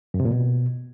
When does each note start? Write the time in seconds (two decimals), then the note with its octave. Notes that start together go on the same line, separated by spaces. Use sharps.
0.14 F#2
0.20 C3
0.25 A#2
0.31 B2